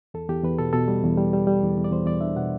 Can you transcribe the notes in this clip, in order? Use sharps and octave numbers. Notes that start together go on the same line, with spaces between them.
E2 A4
E2 G4
E2 B4
B2 A4
B2 A4
G3
E2
G3
G3
G3
E2
E2
D5
E2 C5
E2 D5
D4 E5
B2 F#5